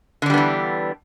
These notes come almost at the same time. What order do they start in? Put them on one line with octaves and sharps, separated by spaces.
D3 D4 G3 B3 E3